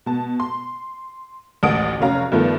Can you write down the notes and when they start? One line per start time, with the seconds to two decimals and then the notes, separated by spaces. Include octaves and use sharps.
0.06 B2 A5
0.40 C6
1.63 A1 D2 F#5 D#6 D7
2.01 F1 F#3 C#4 F5 A#5
2.32 G2 D#3 F3 A3 B3